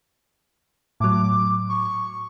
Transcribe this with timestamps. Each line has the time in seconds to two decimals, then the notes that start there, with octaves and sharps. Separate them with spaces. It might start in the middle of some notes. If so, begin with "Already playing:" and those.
1.00 A2 F#3 D6
1.69 C#6